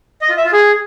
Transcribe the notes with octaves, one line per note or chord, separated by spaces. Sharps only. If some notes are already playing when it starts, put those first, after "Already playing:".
D#5
F4
E5
F4
G#4